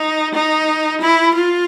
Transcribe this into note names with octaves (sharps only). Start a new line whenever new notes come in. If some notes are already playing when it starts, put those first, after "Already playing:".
Already playing: D#4
D#4
E4
F4